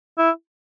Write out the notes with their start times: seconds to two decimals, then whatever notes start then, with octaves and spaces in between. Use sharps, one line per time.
0.18 E4